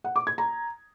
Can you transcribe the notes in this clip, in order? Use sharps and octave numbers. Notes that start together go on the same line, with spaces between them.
F#5
D6
G#6
A#5